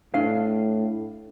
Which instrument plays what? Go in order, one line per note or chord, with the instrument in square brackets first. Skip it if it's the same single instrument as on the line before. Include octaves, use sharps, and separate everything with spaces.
[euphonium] A2 [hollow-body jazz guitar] D4 F5